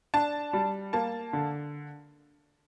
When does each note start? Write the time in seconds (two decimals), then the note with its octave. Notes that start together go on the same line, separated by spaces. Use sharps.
0.14 D4 A5
0.53 G3
0.93 A#3 A5
1.33 D3